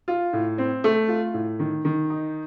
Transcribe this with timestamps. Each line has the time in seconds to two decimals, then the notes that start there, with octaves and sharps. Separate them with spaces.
0.08 F4
0.33 A2
0.58 C4
0.84 A3
1.08 F4
1.34 A2
1.59 D#3
1.85 D#3
2.10 D#4